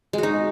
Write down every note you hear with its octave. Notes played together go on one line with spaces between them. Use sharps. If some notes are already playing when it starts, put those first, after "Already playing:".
G#3 D#4 F#4